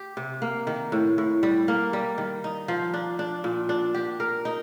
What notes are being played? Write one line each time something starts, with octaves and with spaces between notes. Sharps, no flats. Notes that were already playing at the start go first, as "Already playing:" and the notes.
Already playing: G4
C3
A#3
D#3
A2
A2
G3
A#3
G3
D#3
D#4
F3
D4
D4
A#2
D4
G4
A#4
D#4